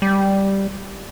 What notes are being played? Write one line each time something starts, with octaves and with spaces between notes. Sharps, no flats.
G3